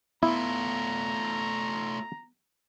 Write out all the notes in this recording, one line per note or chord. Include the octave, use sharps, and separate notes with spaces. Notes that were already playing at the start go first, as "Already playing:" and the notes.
A3 B3 E4 F4 A#5